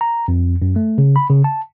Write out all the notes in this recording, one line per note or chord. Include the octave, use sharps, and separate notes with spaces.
A#5
F2
F#2
A3
C#3
B5
C#3
A5